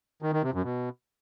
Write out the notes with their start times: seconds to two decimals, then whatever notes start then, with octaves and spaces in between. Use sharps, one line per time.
0.22 D#3
0.33 D#3
0.43 C3
0.54 F#2
0.64 B2